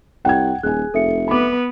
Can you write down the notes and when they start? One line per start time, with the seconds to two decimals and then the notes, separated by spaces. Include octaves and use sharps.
0.25 C2 F#5 G5 G#6
0.63 D#1 G#4 G#5 F#6
0.94 F1 A4 E5 C#7
1.28 B3 B4 B5 D6